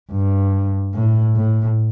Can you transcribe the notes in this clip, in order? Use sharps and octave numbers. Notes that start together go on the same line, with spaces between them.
G2
A2
A2